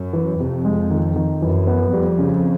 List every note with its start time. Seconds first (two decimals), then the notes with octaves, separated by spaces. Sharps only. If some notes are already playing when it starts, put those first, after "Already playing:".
Already playing: F#2
0.13 E3
0.39 F2 C3
0.65 G#3
0.90 D#3
1.16 D#3
1.42 F#2 E3
1.67 B3
1.93 F2 G3
2.19 C#3